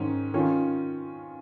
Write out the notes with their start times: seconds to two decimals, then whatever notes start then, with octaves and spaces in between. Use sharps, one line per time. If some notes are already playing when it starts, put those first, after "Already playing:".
Already playing: G#2 D#3 C#4
0.34 D#3 C#4 F4